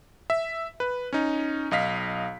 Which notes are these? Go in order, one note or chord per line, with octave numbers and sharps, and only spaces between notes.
E5
B4
C#4 D#4
B1 D#5 F5 B6